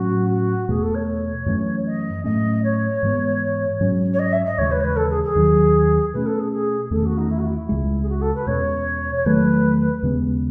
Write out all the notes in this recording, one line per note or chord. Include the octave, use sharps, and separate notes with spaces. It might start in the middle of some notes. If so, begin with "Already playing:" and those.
Already playing: A2 F#3 C#4 F#4
F#4
E2 B2 A3 G#4
A4
C#5
F#2 E3 A3 C#4
D#5
A2 F#3 A3 C#4 D#5
C#5
G#2 E3 G#3 B3
G#2 F#3 C#4
C#5
D#5
E5
D#5
D#2 C#3 E3 G#3 C#5
B4
C#5
B4
A4
G#4
G#4
D#2 D#3 F#3
B2 A3 C#4 B4
A4
G#4
G#4
G#4
E2 D#3 A3 C#4 A4
F#4
D#4
E4
F#4
E4
C#2 C#3 G#3
G#4
F#4
A4
B4
E2 B2 G#3 C#4 C#5
C#5
E2 D#3 F#3 A3 B4
D#2 C#3 G#3 B3